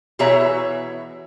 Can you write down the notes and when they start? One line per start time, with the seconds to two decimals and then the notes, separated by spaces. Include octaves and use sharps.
0.19 B2 E3 G#4 C#5 E5 A#5